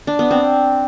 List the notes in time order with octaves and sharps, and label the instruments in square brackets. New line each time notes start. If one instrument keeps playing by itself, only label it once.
[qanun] D4
B3
C4